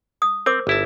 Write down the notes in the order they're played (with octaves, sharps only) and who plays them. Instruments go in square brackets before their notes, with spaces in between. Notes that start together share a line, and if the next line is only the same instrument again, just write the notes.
[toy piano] D#6
[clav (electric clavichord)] C4 [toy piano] A#4 C5 D6
[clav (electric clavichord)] G1 E4 A5